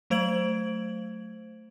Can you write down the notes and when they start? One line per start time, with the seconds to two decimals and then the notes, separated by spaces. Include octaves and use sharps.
0.10 F#3 A3 C5 G#6 D7 F#7